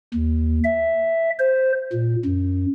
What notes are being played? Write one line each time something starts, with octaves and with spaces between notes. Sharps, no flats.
D#2
E5
C5
A#2
F#2